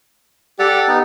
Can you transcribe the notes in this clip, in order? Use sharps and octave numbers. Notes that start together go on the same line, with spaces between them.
G4 A4 D5 F#5
B3 D#4